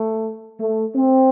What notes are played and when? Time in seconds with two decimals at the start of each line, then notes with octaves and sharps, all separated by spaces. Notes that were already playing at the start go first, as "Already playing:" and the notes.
Already playing: A3
0.60 A3
0.94 C4